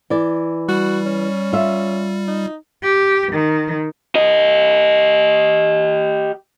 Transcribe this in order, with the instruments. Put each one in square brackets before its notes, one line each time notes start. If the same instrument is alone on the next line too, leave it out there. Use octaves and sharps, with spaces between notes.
[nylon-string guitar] E3 D5
[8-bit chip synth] G3 [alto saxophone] F#4
[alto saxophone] C#4
[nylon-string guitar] F4 E5
[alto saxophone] D#4
[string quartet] G4
D#3
[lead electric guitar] G4 D#5